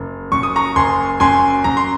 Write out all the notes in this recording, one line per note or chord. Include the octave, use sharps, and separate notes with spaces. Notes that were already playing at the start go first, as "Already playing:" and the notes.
Already playing: F#1
F#2 C#6
D#6
A#5 C#6
F#1 G#5 C6
F#2 G#5 C6
F#2 A#5
C6